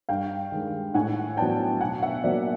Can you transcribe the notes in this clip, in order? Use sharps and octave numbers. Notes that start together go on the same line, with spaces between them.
G2 F5 G5
D#3 G#3
A2 F#5 G#5
F#3 B3 D4 G5 A5
B2 F#5 G#5
E5 F#5
F#3 A#3 D5 E5